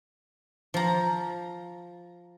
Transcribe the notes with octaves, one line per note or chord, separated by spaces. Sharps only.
F3 A#5